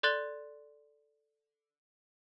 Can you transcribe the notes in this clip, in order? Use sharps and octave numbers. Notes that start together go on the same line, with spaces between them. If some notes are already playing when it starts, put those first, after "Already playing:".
A4 D5 C6 F#6 A6 G7